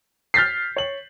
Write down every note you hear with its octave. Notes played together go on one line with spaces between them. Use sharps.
F6 G6 A6 B6 C7
C#5 F#7